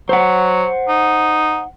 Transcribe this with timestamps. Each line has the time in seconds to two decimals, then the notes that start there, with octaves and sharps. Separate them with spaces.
0.09 F#3 C5 F#5
0.88 D#4